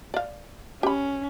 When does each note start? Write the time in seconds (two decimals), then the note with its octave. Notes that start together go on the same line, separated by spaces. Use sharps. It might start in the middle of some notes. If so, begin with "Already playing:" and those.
0.14 D5 F5
0.83 C#4 G4 B5